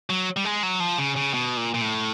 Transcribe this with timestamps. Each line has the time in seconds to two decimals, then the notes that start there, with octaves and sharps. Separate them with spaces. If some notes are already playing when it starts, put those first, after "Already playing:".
0.10 F#3
0.37 G3
0.45 G#3
0.63 F#3
0.80 F3
0.98 C#3
1.16 C#3
1.34 B2
1.57 A#2
1.74 A#2
1.81 A2